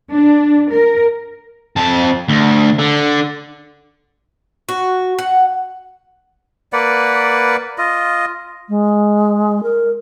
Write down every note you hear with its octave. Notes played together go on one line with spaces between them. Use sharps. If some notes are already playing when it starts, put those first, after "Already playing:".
D4
A#4
F2 A5
D2
D3
F#4
F#5
A#3 B4 D5 F#5
F4 D#5
G#3
A#4